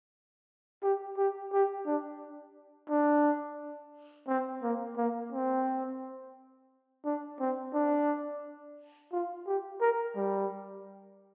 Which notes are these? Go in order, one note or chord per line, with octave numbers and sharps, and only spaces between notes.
G4
G4
G4
D4
D4
C4
A#3
A#3
C4
D4
C4
D4
F4
G4
A#4
G3